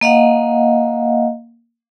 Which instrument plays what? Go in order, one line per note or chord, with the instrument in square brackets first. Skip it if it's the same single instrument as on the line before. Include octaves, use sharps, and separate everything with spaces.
[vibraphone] A#3 D#5 F5 F#5